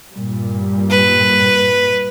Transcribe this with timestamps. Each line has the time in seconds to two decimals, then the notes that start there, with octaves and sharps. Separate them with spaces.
0.13 G2 A#2 G3
0.90 B4